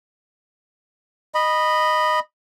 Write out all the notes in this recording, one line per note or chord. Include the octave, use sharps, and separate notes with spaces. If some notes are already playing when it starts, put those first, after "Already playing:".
D#5 B5